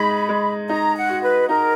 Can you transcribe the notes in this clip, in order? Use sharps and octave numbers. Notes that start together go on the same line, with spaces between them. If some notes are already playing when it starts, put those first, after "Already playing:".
Already playing: G#3 D#4 B5
G#3
D#4 A#5
F#5
F#4
B4
D#4 A#4